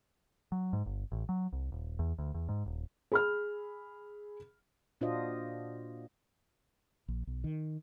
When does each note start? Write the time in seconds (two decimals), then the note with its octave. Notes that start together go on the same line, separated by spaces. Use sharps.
0.52 F#3
0.73 G#2
0.86 G1
1.12 A1
1.29 F#3
1.53 C2
1.72 D#1
1.99 E2
2.19 D2
2.34 E2
2.49 G#2
2.66 D#1
3.12 G#4 B5 F6
5.01 A#2 D4 F4 F#4 C5 D#5
7.08 A#1
7.27 B1
7.44 D#3